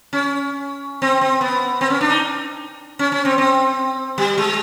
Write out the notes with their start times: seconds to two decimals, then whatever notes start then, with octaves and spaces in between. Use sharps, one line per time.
0.13 C#4
1.02 C4
1.21 C4
1.41 B3
1.81 C4
1.90 C#4
2.01 D4
2.10 D#4
2.99 C#4
3.12 C#4
3.25 C4
3.38 C4
4.18 G3
4.38 G#3